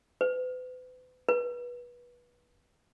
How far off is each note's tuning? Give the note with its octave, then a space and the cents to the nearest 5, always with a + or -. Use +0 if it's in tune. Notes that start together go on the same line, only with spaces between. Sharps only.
B4 +40
B4 -25